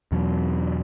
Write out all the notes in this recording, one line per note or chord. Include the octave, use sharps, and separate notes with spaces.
E2 B2 F#3